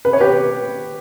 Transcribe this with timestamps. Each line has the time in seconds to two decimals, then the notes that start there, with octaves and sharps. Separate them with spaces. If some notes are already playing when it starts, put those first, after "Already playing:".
0.05 B4
0.13 C#5
0.20 G4 B4